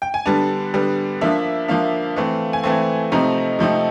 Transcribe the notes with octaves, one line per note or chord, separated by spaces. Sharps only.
G5
G#5
D3 G3 B3 D4 A5
D3 G3 B3 D4
F3 A#3 D4 E5
F3 A#3 D4 F5
E3 A3 C4
G#5
E3 A3 C4 A5
C3 F3 A3 C4 D#4 A#5
C3 F3 A3 C4 D#4